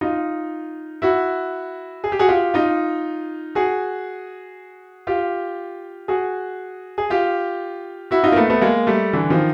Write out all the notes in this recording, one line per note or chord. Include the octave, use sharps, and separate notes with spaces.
D#4 F4
E4 F#4
G#4
G4
F#4 G#4
F4 G4
D#4 F4
F#4 G#4
F4 G4
F#4 G#4
G#4
F4 G4
E4 F#4
D#4 F4
A#3
A3 B3
A3 B3
G#3 A#3
G3 A3
D3 E3
D#3 F3